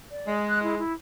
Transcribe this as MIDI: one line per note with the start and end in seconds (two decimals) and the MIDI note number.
0.11 0.34 74
0.27 0.80 56
0.49 0.62 90
0.63 0.78 64
0.78 0.93 64